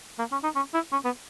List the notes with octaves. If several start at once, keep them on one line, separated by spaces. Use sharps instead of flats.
A#3
C#4
D#4
C#4
E4
C#4
B3